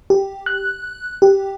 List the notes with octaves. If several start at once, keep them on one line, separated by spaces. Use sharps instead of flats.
G4
F#6
G4